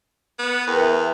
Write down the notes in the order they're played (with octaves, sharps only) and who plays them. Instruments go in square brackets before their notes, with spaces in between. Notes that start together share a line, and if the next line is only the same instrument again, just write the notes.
[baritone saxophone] B3
[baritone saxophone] E2 [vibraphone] A#4 B4 G5
[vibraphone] E5